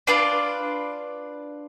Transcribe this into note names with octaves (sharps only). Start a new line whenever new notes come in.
D4 F4 B4 D5